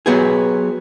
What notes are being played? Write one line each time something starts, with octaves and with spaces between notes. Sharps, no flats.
F#3 B3 G4 G#4